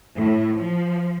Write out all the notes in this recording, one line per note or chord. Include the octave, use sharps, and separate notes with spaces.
A2
F3